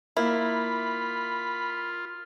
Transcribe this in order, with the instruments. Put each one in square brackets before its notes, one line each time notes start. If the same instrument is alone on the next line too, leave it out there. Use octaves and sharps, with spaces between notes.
[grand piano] A#3 [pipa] E4 [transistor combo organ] F4 [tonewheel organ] B5